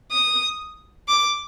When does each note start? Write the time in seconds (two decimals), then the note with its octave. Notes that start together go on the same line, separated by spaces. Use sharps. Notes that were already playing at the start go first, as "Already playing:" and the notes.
0.11 D#6
1.08 D6